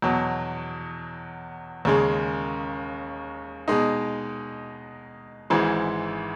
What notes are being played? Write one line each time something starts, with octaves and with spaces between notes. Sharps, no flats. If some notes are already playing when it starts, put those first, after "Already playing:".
E2 B2 F#3
D#2 C#3 G#3
B2 G#3 D#4
G#1 G#2 E3 G#3